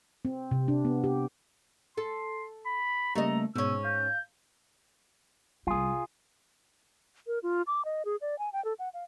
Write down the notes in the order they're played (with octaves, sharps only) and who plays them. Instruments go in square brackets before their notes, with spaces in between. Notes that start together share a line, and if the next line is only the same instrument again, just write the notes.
[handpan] C4
C3
D4
B3
G4
[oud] A4 [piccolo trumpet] C6
[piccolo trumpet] B5
[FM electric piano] C#3 G3 A#3 [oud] A3 D#5 [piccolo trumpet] A#5
[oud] G#2 C#4 [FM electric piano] B2 [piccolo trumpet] E6
[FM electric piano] F5 [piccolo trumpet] G6
[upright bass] C2 G3 [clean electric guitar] F4 G#4
[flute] A#4
F4
D6
D#5
G#4
D5
G#5
G5
A4
F#5
F5